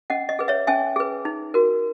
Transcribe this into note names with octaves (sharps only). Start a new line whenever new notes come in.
C#4 D#5 F#5
D#5
G#4 B4
C#5 E5
C#4 E5 G#5
G#4 B4
D#4
F#4 A#4